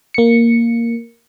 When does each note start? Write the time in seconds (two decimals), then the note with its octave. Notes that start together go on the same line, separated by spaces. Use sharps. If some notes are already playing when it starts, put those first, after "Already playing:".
0.14 A#3 C#7